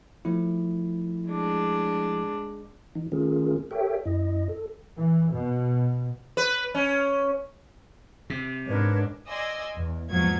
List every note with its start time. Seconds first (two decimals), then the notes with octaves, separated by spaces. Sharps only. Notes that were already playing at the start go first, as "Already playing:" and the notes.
0.25 F3 A3 E4
1.28 G#3 D4
2.95 E3 D#4
3.12 D#3 A3 C#4 F4 G#4 A#4
3.71 G4 A4 A#4 C#5 E5 G5
4.05 F#2 E4 D#5
4.49 A4
4.97 E3
5.33 B2
6.37 B4
6.75 C#4
8.30 C3
8.67 G#2 D4 A#4 B4 C#5
9.28 D5 D#5 G#5 C6 E6
9.75 E2
10.09 E2 G#2 F3 F#3 A#3 G#6